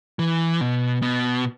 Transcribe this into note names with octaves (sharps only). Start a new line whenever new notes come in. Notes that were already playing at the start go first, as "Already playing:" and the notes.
E3
B2
B2